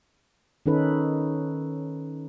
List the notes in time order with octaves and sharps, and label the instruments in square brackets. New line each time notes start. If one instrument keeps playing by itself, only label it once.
[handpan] D#3 C#4 D#4 A4 B4